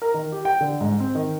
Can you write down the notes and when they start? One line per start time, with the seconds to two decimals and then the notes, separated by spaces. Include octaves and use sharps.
0.02 A#4
0.14 D#3
0.32 G4
0.45 G5
0.61 D3
0.81 G#2
1.00 C4
1.15 D#3